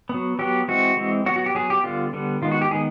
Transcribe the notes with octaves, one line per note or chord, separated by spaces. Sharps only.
F#3 B3
F#3 B3 G4
E3 G#3 C4 F#4
E3 G#3 C4
F#3 B3 F#4
F#4
G4
F#3 B3 G#4
G4
D3 G3 B3 F4
D3 G3 B3
D#3 G#3 B3 F4
F#4
G4
D#3 G#3 B3 G#4